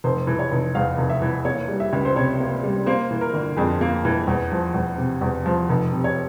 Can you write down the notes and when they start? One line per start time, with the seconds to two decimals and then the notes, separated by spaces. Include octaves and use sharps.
0.04 F1 C5
0.27 E3
0.39 C#5
0.51 F1
0.75 E2 F5
0.98 F1
1.10 E5
1.22 E3
1.45 A#3 C#5
1.68 G3
1.80 E5
1.93 C#2
2.05 C5
2.16 C3 C#5
2.40 A#3
2.63 G3
2.86 A#3 C5
3.11 E3
3.21 A#4
3.33 G1
3.57 F2 G#4
3.81 A#3
4.05 E3
4.27 E2
4.52 F3
4.74 E2
4.98 C3
5.22 E2
5.46 F3
5.69 F1
5.92 C3
6.04 C#5